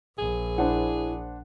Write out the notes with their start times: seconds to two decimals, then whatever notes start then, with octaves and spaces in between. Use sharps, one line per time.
0.18 A#1 G#4
0.58 D4 E4 C5 F#5